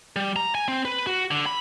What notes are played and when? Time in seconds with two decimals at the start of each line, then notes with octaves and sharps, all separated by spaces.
0.16 G3
0.36 A#5
0.55 G#5
0.68 C4
0.85 B4
1.07 F#4
1.31 D3
1.46 B5